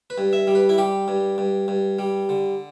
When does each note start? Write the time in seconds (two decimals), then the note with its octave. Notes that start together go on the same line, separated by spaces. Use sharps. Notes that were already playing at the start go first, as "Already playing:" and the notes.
0.10 B4
0.18 G2
0.33 E5
0.47 G3
0.55 B4
0.69 E4
0.78 G3 G4
1.08 G2
1.38 G2
1.68 G2
1.99 G3
2.29 D3